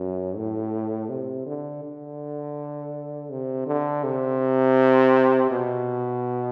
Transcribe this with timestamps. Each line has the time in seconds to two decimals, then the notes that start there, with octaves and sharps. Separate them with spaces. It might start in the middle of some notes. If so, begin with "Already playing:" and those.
Already playing: F#2
0.36 A2
1.09 C3
1.46 D3
1.83 D3
3.30 C3
3.67 D3
4.04 C3
5.51 B2